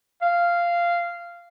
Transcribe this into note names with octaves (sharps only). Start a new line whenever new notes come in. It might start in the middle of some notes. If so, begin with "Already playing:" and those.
F5